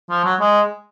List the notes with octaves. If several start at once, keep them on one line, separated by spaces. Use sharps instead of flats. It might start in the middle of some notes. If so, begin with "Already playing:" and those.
F3
F#3
G#3